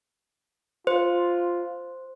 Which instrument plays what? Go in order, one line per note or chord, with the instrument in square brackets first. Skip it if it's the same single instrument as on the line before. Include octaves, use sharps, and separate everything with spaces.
[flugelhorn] F4 [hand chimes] C5